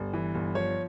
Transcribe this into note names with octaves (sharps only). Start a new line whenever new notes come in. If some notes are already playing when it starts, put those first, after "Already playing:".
Already playing: G1
E3
G1
F3 C#5